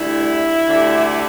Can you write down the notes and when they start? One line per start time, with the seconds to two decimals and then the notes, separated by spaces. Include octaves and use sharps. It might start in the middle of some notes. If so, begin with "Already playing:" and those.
Already playing: D2 D3 G3 E4
0.66 D2 D3 G3